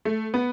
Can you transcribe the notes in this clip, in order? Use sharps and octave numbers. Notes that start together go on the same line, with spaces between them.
A3
B3